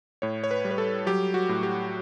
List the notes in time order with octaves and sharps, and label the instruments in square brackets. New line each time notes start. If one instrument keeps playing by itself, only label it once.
[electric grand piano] A2 C#5
C#5
B4
G3
B4
A4
F#3 G4
F#4
A2
G4